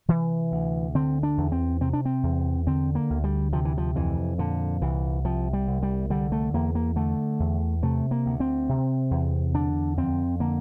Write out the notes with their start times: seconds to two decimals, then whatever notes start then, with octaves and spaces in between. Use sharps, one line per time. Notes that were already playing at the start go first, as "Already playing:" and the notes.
0.08 C3 E3
0.52 D2
0.95 D3 C4
1.23 D4
1.38 E2
1.52 C4
1.81 C3 C4
1.93 D4
2.05 C4
2.23 E2
2.67 D3 C4
2.95 A#3
3.10 D2
3.24 G3
3.53 C3 F3
3.65 E3
3.78 F3
3.95 F2 E3
4.38 A#2 D3
4.82 C2 E3
5.25 C3 F3
5.53 G3
5.68 C2
5.83 G3
6.10 D3 G3
6.32 A3
6.54 E2 A#3
6.75 A#3
6.96 D3 A3
7.40 E2
7.83 C3 A3
8.11 A#3
8.26 D2
8.40 C4
8.69 C3
9.11 E2
9.54 D3 D4
9.98 F2 C4
10.40 D3 A#3